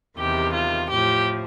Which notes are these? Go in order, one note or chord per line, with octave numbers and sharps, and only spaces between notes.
E2 C3 D#3 G4
F4
A2 F3 G4